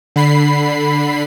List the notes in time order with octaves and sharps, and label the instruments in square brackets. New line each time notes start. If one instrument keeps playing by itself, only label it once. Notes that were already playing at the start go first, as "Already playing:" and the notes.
[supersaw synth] D3 B5 C7